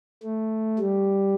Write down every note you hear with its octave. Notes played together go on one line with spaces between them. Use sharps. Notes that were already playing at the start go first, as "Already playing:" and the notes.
A3
G3